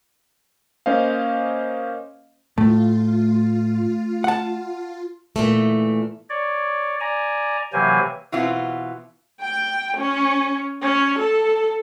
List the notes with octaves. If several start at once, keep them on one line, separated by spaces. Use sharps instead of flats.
A#3 C#4 C5 D#5 F5
A2 A3 F4
F#5 A5
A#2 E3 A3
C#5 D5
D5 G#5 A#5
C3 E3 F#3 A#3 C5 G#5
B2 E3 B3 C4 E4 F4
G5
C#4
C#4
A4